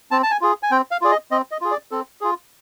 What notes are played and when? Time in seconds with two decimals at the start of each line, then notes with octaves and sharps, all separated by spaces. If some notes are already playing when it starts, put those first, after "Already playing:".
0.11 C4 A5
0.23 A5
0.31 G#5
0.41 F4 G#4
0.63 G#5
0.71 C4 G5
0.91 F5
1.02 F4 G#4 D5
1.11 D#5
1.31 C4 D#5
1.51 D#5
1.61 F4 G#4
1.71 D5
1.91 C4 A4
2.21 F4 G#4